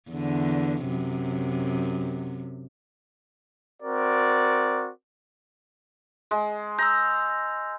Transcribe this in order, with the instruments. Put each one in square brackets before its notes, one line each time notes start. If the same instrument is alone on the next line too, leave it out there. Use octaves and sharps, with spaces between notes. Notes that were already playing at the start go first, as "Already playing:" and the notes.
[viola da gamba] E2 D3
F#2 C3
[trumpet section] C4 F#4 A#4 D5
[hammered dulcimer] G#3
[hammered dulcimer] A#5 [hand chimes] E6 G6